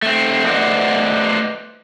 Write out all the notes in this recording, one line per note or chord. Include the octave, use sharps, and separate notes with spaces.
A3 C4
A3 B4 C5 D5 D#5 F#5